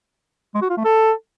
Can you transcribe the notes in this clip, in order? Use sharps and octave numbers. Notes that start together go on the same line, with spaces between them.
G#3
F#4
F4
A3
A4